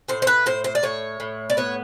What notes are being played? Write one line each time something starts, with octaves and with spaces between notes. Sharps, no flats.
A2 C5
C5
B4
A2 C5
C5
D5
A2 C#5
A2
D5
B3 C#5